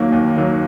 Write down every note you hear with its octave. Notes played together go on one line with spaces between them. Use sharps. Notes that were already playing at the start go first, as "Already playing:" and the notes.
Already playing: D#2 D#3 F#3 A#3
D#2
D#3 F#3 A#3